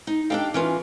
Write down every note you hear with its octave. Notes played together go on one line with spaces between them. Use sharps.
D#4
D4 D#4 G4 A4 F5 G5
E3 C#4 F4 A#4